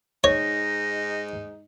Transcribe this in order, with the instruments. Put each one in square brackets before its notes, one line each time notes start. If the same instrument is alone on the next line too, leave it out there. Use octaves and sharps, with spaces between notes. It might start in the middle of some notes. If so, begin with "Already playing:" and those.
[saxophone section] G#2 D#4 [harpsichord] C#5 [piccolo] A#6